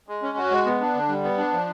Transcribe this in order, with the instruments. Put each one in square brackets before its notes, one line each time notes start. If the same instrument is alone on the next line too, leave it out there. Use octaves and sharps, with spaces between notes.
[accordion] G#3
C#4
F#4
G#3
B3
D4
D3
G3
B3
D4
F3